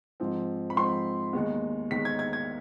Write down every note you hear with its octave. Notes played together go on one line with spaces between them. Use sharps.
G#2 F3 C4
B5
G#2 F3 C4 C6
D#2 D#3 G#3 B3
D#2 D#3 G#3 B3 B6
G#6
G#6
G#6